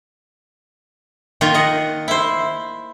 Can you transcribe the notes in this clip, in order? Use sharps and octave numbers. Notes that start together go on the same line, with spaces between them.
D#3 A#3 F4
D#5 F#5
E4 C5